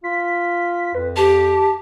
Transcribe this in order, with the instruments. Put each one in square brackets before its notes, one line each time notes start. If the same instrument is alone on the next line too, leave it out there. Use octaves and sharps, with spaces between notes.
[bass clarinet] F4 [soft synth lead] B6
[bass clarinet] F2 [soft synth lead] B4
[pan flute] G4 [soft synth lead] A5